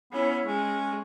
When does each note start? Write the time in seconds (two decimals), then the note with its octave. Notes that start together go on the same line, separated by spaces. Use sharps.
0.12 B3 C#4 E4
0.46 G#3 C#4